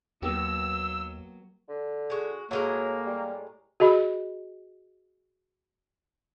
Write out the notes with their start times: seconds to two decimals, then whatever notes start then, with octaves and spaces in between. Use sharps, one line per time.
0.22 D#2 F#3 A#3 B3 G4 E6
1.69 D3
2.10 G#3 F#4
2.51 A2 F#3 G#3 A#3 A#4
3.06 G3
3.80 F#4 G#4 D#5 B5